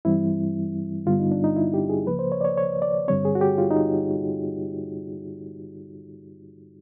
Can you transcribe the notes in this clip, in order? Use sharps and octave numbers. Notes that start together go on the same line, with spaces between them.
G2 E3 G3 C4 E4
G2 D3 G3 B3 F4
D#4
D4
D#4
E4
G4
G#4
C#2 C#3 F3 A#3 B4
C5
C#5
D5
C#5
C#5
D5
G2 D3 G3 C4 C#5
G#4
F#4
G4
F4
D#4